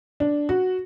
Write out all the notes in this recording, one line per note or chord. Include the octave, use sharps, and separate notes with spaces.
D4
F#4